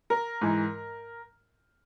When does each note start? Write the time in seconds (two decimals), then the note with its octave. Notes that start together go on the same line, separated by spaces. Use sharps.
0.10 A#4
0.41 G#2 E3